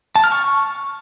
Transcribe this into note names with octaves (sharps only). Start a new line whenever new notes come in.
A5
F6
C#6